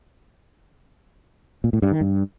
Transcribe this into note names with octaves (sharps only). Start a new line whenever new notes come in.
A#2
A2
G2
D#3
G2